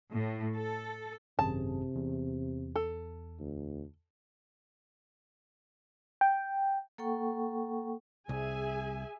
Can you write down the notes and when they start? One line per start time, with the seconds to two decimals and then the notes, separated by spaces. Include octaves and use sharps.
0.11 A2
0.55 A4
1.39 G#1 F#2 C3 G#4 A5
1.95 E2
2.76 A4
3.39 D2
6.21 G5
6.98 A#3 A4 F#5 G5 C#6
8.29 C2 G#4 E5 G#5